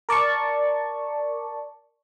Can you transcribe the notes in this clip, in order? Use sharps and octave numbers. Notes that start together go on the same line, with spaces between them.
A#4 D5 A5 C#6